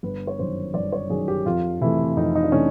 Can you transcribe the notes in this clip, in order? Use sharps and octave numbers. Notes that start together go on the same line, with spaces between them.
G1 B4
C#5
F#2 D#3 C5
G1 D5
C#5
F#2 D#3 G#4
G4
F2 F4
C3 E3 A3 E4
F2 D#4
D#4
D4
C3 E3 A3 C#4